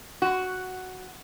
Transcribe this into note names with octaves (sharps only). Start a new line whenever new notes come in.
F#4